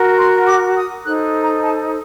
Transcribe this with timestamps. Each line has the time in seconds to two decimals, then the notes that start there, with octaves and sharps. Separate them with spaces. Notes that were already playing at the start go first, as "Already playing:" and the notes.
Already playing: F#4 A#4
0.17 C6
0.46 D6
0.75 D#6
1.04 D#4 A4 C5 F#6
1.42 A#5
1.62 A5